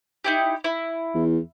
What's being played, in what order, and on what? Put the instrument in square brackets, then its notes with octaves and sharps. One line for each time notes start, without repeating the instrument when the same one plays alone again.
[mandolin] D#4 E4 G4
E4
[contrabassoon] E2